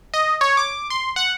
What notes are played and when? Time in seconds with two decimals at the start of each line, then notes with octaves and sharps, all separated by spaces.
0.14 D#5
0.41 C#5
0.57 D6
0.90 C6
1.16 F#5